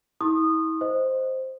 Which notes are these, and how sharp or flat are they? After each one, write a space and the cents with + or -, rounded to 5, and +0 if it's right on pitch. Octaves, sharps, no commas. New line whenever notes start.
E4 -45 C6 +40 D#6 -20
C5 +0 D#5 +10